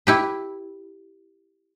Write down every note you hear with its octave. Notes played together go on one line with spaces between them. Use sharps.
E4 G4 B4